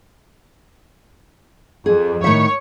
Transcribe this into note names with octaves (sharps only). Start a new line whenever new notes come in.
F2 G#4
A2 D#3 C#5 E5